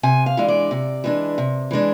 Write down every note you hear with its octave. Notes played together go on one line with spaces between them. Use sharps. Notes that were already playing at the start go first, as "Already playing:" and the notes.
C3 G#5
F5
E3 G#3 D4
D5
C3
E3 G#3 D4
C3
E3 G#3 D4